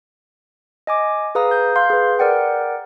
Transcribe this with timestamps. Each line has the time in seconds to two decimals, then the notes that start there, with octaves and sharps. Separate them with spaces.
0.87 D#5 G#5 D6
1.35 G#4 B4 F5 A#5 D#6
1.51 G6
1.76 F5 C6 G6
1.90 G#4 B4
2.19 A#4 D5 F#5 G5